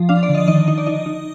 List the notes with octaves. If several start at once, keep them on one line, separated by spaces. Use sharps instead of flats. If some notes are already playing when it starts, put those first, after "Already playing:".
Already playing: F3
D4 F5
D5
D3
D#5
D#3 D#5
D#4 D#5
D5
D#4 D#5
D#4